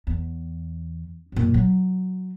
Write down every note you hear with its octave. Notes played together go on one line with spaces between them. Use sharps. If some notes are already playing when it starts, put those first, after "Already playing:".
E2
F#2 A#2
F#3